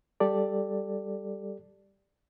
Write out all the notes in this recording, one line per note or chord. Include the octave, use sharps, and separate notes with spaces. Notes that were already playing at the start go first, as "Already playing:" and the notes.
G3 G4 A4 D5